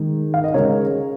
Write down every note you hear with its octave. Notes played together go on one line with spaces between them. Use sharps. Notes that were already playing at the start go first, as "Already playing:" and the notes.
Already playing: D#3 G#3
F5
D#5
C#3 G#3 A#4 C#5